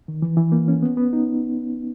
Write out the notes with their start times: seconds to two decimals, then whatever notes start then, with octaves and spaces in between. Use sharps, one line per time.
0.08 D#3
0.22 E3
0.37 E3
0.52 A#3
0.68 C#4
0.83 B3
0.97 B3
1.13 D#4